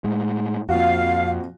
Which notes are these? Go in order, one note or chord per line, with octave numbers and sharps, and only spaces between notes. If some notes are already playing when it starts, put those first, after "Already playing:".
A2 G#3
F2 A#2 F3 F#4 F5